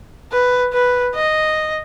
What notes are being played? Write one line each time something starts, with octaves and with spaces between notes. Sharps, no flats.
B4
B4
D#5